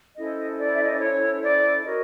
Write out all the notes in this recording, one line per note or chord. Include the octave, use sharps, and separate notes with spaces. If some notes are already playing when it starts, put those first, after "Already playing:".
C#4 E4 A4 C5 D#5
D5
E5
D#5
D5
C#5
D5
F#4 A#4 C#5 D#5